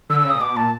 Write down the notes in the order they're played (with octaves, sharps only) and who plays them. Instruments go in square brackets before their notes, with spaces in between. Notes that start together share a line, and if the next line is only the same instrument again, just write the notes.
[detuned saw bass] D3 [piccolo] E6
[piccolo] E6
[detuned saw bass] C#3
[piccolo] D#6
[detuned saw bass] A#2
[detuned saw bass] B2 [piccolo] D6
[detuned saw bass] A#2 [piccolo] A5